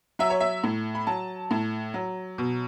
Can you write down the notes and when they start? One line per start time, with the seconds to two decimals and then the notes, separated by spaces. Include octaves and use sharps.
0.19 F#3 E5
0.30 C#5
0.40 E5
0.64 A2
0.95 B5
1.07 F#3 A5
1.51 A2
1.94 F#3
2.38 B2